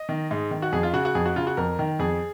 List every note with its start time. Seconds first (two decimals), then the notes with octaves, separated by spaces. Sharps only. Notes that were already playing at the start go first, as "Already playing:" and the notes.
Already playing: D#5
0.09 D#3
0.31 G#2
0.51 D#3
0.62 F#4
0.72 F2 G#4
0.83 F4
0.93 C#3 F#4
1.05 F#4
1.15 F2 G#4
1.26 F#4
1.36 C#3 F4
1.47 F#4
1.57 F2 A#4
1.79 D#3
1.99 F2 G#4